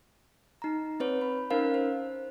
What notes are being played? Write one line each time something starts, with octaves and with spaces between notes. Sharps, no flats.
D#4 A#5
C4 B4 C#5
B5
C#4 D#4 A#4 C5 F5
C5